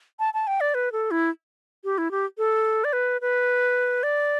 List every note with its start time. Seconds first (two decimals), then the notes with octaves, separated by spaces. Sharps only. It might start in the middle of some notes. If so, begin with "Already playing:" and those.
0.19 A5
0.34 A5
0.47 G5
0.61 D5
0.74 B4
0.92 A4
1.11 E4
1.84 G4
1.98 E4
2.11 G4
2.38 A4
2.84 D5
2.93 B4
3.21 B4
4.03 D5